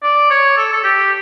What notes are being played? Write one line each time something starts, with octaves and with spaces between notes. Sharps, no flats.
D5
C#5
A4
A4
G4